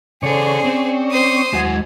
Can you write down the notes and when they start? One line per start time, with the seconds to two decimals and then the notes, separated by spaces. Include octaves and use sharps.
0.23 C#3 C#4 G#4 A4 C5 D5 C#6
0.65 C4
1.12 C5 D#6
1.53 D#2 F#3 G#3 F#5 G#5